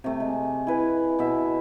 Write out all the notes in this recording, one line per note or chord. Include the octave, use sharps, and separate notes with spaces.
C3 A3
G#3
E4 B4 F5 G#5
B2 E5